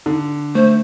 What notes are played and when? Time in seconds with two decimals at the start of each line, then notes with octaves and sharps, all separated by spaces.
0.06 D3
0.55 A3 C5